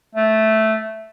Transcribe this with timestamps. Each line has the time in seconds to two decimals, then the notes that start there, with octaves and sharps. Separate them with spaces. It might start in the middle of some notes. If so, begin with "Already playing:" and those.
0.15 A3